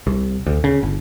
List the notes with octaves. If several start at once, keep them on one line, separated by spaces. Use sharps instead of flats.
C2
D2
C#3
G1